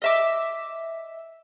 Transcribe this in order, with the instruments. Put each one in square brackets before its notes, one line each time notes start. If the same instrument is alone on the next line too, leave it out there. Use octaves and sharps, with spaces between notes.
[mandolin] D#5 E5 D6